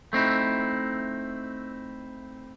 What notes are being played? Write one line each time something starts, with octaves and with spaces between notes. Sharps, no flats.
A3 C4 D#4 E4